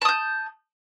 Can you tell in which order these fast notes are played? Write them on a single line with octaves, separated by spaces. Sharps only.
A5 D#6 G6